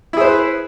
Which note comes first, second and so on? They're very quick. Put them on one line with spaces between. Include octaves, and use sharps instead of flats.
E4 G#4 C5 B4